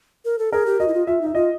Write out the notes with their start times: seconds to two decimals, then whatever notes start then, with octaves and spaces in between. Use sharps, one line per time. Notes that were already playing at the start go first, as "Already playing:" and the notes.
0.25 A#4
0.39 A4
0.52 G#4 A#4
0.66 G4
0.80 F#4 D#5
0.88 E4
0.94 F4
1.07 F4 E5
1.21 D#4
1.26 E5
1.35 F4 D#5